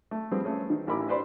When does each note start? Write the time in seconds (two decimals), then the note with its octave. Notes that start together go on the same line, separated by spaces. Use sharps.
0.11 A3
0.31 F3 G3 C4 G#4 B4
0.44 A3 C#4 G#4
0.70 D#3
0.87 A1 E4 A#4 B5 D6
1.08 B4 C5 D5 B5 C6